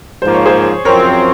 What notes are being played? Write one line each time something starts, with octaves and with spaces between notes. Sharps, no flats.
G#2 F3 A#3 C5
C#5
G#4 C5
F#2 F3 C4 A#4 C#5